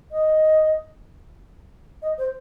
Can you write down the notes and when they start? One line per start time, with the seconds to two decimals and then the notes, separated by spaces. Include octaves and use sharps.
0.11 D#5
2.02 D#5
2.18 C5